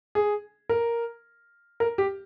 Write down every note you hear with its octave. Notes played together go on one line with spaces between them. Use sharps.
G#4
A#4
A#4
G4